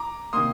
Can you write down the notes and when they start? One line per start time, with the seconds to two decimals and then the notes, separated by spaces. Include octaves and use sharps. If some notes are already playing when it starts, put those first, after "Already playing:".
Already playing: A#5 D6
0.33 C3 D#3 A#3 C6 D#6